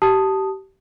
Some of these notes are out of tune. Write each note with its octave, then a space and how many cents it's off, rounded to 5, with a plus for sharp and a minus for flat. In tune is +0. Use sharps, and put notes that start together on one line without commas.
G4 -25 A5 +0 D#6 +0